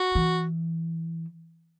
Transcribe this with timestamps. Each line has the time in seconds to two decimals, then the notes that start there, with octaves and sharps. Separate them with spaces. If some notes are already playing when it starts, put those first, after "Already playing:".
Already playing: F#4
0.15 E3